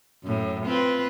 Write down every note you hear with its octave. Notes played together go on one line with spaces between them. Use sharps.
F#2 A2
C4 F4 B4